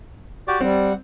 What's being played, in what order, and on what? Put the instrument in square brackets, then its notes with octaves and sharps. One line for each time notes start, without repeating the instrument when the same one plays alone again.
[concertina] F#4 G4 D5
[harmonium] G3 [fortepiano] C4 [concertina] F#5